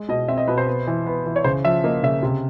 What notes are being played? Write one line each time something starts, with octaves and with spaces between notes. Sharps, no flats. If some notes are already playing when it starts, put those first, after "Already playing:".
Already playing: G#3
B2 D#5
C4 E5
D#5
B2 B4
C5
B3
E3
B3
E3
C#5
C#3 C5
F3 E5
A#3 D#5
C#3 E5
C3